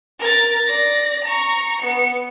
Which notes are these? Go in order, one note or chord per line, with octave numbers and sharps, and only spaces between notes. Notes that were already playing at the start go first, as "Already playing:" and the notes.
A#4 A6
D5 A#6
A#5 C#6
B3 C#7